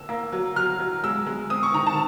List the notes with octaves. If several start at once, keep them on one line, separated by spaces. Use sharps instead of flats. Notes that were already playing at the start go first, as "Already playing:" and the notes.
Already playing: E6
A#3
F#3
F#3 F6
F#3
G#3 E6
G#3
C4 D#6
C#6
D#3 A#5
A5